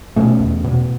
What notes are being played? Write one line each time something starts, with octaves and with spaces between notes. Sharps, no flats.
B2 A3 C#4
E2
B2